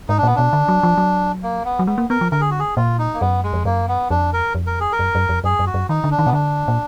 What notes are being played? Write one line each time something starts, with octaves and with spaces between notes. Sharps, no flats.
G#2 D#4
D4
A#2 B3
B2 D4
D3
F#3
F3
F#3
A#3
B3
F#3
G#3 B3
A#3
B3 A#4
F3
D3 A#4
G#4
F#4
G#4
A#2 F4
D#4
A#3
F#2 B3
G#3
F2
F#2 A#3
B3
F2 D4
A#4
F2
A#4
G#4
A#4
F#2
F#2
F2
F#2 G#4
F#2
F#4
F#2
D#3 D#4
D3
D4
D#3
B2 B3
D3 D4
A#2